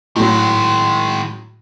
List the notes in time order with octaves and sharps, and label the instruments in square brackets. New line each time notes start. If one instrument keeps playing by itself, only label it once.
[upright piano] A2 F#3 [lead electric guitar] D#3 G#3